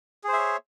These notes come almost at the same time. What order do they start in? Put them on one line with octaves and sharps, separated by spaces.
G#4 C5 E5 C#5